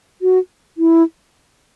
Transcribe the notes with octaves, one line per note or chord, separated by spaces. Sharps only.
F#4
E4